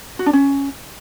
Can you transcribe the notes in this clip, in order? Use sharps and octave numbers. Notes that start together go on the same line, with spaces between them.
F#4
D4
C#4